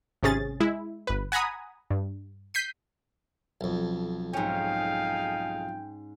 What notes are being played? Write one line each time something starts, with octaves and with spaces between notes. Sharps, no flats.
G#1 C3 C#4 G#4 A6
G#3 E4
G1 B4
F#5 G#5 A#5 B5 D#6
G2
G6 B6 C7 D#7
B1 F2
G#2 C#4 D#4 G#4 F5 G5